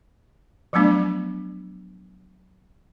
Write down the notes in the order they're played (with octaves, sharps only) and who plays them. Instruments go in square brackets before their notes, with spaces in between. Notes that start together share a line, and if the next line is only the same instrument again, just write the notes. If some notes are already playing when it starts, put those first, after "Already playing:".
[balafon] F3 F#3 A3 B3 D4